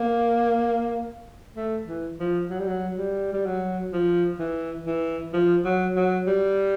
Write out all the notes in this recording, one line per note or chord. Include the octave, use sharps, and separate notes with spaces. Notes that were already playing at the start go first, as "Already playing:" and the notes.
Already playing: A#3
A3
E3
F3
F#3
G3
F#3
G3
G3
F#3
F3
E3
E3
F3
F#3
F#3
G3